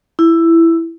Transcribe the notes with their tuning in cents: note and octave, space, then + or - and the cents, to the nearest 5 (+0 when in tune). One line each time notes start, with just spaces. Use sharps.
E4 +10